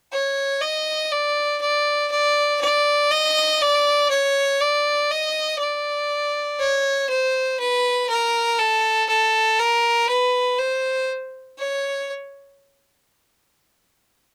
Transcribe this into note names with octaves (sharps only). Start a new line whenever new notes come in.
C#5
D#5
D5
D5
D5
D5
D#5
D5
C#5
D5
D#5
D5
C#5
C5
B4
A#4
A4
A4
A#4
B4
C5
C#5